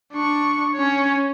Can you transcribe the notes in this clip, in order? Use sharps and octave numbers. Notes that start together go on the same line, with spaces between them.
D4 C#6
C#4 C#5